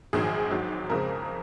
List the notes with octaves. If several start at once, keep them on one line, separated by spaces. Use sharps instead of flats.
A#1 G#2 D#3 F#3 G#4
G#1 G#2 F#3
F2 C#3 G#3 C4 A#4